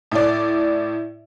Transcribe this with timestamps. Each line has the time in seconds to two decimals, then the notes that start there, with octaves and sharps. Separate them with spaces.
0.11 A2 D5